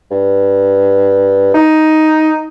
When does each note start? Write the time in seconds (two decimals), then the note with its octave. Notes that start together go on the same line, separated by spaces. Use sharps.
0.11 G2
1.54 D#4